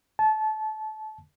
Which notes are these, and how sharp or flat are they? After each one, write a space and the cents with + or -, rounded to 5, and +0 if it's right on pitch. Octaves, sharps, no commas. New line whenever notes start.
A5 -25